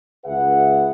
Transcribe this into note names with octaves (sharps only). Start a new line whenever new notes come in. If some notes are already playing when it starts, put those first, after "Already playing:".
C#2 G#4 B4 E5 F#5